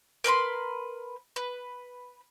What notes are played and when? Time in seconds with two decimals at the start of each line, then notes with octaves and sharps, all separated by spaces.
0.24 A#4 B4 B5 C6
1.36 B4